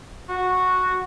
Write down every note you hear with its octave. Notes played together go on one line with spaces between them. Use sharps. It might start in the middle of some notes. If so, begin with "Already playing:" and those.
F#4